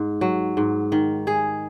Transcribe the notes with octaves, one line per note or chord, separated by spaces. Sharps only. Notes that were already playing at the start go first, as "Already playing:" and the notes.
Already playing: G#2
F#3
G#2
D#3
G#4